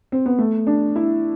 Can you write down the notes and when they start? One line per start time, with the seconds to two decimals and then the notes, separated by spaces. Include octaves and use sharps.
0.12 C4
0.26 B3
0.39 A3
0.67 D4
0.96 E4